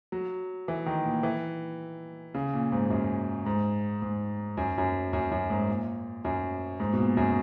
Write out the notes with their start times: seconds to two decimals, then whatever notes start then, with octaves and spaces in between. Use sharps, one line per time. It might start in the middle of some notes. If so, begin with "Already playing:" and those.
0.12 F#3
0.68 E3
0.86 D#3
1.05 A#2
1.23 E3
2.34 C#3
2.53 A#2
2.72 G#2
2.90 F#2
3.46 G#2
4.02 G#2
4.57 F#2
4.78 F#2
5.13 F#2
5.31 F#2
5.50 G#2
5.69 A#2
6.25 F#2
6.80 G#2
6.93 B2
6.98 A#2
7.17 F#2